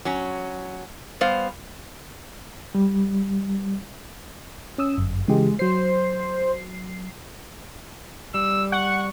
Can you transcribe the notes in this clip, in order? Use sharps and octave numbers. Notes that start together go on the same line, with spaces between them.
F#3 C#4
G3 B3 C5 F5
G3
C#4 D#6 E6
G1 F#2
C#3 E3 G#3 G4
F#3 C5 C7
G3 E6
F#5 C#6